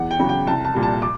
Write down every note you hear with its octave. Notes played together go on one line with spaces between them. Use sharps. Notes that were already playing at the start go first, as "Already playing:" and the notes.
Already playing: E2 F#5
G5
C#3 F#3
G5
C2 A5
A5
A#2 G3
A5
D6